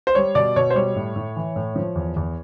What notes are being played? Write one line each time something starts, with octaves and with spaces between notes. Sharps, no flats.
C5
G3 C#5
B2 D5
B2 C#5
C5
G3 C#5
A2
A2
E3
A2
F3
E2
E2